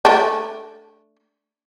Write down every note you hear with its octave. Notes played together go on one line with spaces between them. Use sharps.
A3 D4